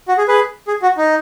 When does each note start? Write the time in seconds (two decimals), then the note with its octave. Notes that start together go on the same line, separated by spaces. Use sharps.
0.08 F#4
0.18 G#4
0.28 G#4 B4
0.68 G#4
0.82 F#4
0.97 D#4